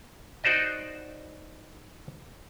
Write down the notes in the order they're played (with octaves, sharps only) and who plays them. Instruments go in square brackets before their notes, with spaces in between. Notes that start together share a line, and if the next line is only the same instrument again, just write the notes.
[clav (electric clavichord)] D#4 F#4 C5 D5 D#5